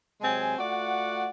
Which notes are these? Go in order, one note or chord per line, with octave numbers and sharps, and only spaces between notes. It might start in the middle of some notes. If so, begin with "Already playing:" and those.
C3 F#3 G#3 C4 G#5
A3 F4 F#4 D5 F#5